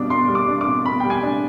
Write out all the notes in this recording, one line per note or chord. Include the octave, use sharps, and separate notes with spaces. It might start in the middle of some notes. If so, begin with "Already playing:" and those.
Already playing: B2 G3 D4 D6
B2 C6
G3
D6
D4
D6
B2
B2 B5
G3 G5
G#5
D4